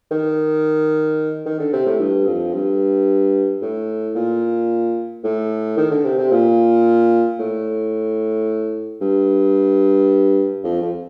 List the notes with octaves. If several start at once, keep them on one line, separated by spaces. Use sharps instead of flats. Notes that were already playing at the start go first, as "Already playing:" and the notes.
D#3
D#3
D3
C3
A2
G2
F2
G2
A2
A#2
A2
D#3
D3
C3
C3
A#2
A2
G2
F2
F2